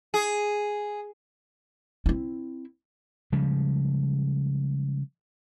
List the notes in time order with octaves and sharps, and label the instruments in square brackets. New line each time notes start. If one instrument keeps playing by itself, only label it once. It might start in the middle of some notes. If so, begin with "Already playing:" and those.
[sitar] G#4
[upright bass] C4 E4
[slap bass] C#3 F3 G3 G#3